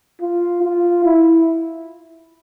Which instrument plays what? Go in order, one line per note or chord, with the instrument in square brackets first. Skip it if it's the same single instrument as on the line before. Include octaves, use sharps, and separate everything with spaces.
[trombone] F4
F4
E4